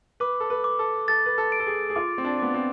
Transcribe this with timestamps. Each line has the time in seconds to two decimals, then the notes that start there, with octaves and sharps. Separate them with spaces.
0.20 B4 D6
0.40 A4
0.50 B4
0.64 D6
0.79 A4
1.08 A4 A6
1.26 B4
1.38 A4
1.52 D7
1.60 A4
1.67 G#4
1.90 G#4
1.96 F4 D6
2.18 C4
2.24 D4
2.40 B3 D6
2.54 C4